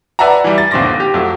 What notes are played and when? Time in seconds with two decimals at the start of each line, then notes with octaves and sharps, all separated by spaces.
0.19 B4 D5 E5 F#5 A5 A#5
0.44 E3 G3
0.58 A6
0.71 G1 D#2 C4 C6 D6 A#6
1.00 G4
1.14 F2 F#3 A3